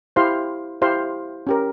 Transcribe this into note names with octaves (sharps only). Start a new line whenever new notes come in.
E4 G4 C5 F5 C6
E4 G4 C5 F5 C6
C#4 G4 A#4